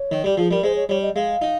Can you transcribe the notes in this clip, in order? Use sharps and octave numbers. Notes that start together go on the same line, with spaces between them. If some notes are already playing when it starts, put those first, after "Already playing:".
Already playing: C#5
D#3
G3 G4
F3 G#4
G3 A#4
G#3 C5
C#5
G3 C#5
D#5
G#3 F5
D#4